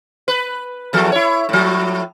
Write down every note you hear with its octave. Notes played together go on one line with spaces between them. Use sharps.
B4
E2 F3 A4
E4 C#5
A2 F3